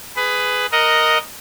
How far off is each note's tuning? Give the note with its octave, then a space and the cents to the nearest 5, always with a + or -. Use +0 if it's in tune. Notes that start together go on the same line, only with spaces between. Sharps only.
G#4 +0 B4 +15
A#4 +0 D#5 +0 F#5 +5